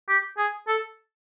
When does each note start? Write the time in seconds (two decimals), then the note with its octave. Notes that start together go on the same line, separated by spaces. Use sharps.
0.09 G4
0.38 G#4
0.68 A4